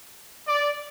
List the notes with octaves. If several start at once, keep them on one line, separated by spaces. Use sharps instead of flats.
D5